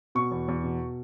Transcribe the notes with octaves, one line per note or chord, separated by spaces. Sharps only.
B2 C#6
E2
E2
B2